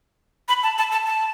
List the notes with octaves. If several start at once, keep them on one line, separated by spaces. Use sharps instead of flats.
B5
A5
A5
A5
A5